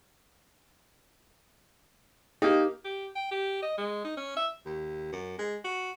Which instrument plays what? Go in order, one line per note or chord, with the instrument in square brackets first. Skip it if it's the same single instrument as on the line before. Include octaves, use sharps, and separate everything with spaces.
[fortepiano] A#3 D#4 [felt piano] G4
[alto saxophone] G4
G5
G4
D#5
G#3
D#4
C#4
E5
[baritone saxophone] D#2
F#2
G#3
F#4